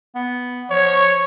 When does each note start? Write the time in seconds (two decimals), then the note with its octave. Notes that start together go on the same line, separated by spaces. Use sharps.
0.15 B3
0.71 F3 C#5